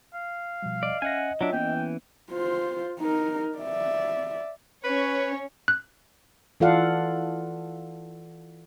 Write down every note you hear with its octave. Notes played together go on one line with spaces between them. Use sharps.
F5
B2 F3 G3
D5 D#5
C#4 D#5 E5 F#5 G#5 A#6
F#3 D4 F4 C#5 E5
E3 A#3 B3 C#4 G5
F4 C5
D#4 A#4
D5 E5
C#4 B4 C#5
F#6
E3 F4 A4 D5 F5 F#5